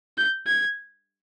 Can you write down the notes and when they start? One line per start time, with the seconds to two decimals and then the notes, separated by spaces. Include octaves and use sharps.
0.18 G6
0.47 G#6